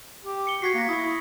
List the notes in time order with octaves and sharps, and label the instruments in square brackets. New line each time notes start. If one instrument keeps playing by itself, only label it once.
[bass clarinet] G4
[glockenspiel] C#7 G7
[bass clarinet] F#4 [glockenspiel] G#6 B6 C7
[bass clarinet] A#3 [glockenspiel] A#6 C#7
[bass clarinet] E4 [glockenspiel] C#6 D#6
[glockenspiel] B5